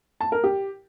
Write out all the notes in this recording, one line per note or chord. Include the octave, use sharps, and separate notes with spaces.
A5
A#4
G4